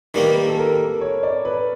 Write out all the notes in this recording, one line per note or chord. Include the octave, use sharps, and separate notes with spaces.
D#3 G3 A#3 B4
A4
A#4
C#5
D5
B4